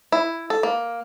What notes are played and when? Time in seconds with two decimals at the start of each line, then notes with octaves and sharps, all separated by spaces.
0.12 E4
0.50 A4
0.63 A#3